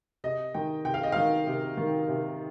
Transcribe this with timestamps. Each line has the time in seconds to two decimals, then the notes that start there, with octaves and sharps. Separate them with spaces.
0.24 C3 D#5
0.54 D#3 G5
0.85 C3 G5
0.94 F5
1.03 D#5
1.12 D#3 F5
1.47 C3
1.77 D#3
2.08 C3